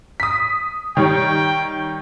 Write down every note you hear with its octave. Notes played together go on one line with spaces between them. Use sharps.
D#6 B6
D#3 G3 C#5 G5